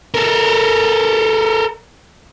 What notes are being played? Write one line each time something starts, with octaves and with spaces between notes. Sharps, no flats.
A4 A#4